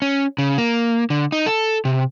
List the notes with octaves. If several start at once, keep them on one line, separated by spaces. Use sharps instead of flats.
C#4
C#3
A#3
D3
D#4
A4
C3